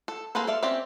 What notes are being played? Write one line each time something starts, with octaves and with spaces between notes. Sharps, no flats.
A4
A#3 G#4 A4 B4 C5
A4 D5 E5 F5
C4 C#4 G4 D5 E5